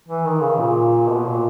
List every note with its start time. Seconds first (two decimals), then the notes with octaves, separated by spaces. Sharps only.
0.08 E3
0.25 D#3
0.41 C#3
0.59 A#2
1.09 B2
1.27 A#2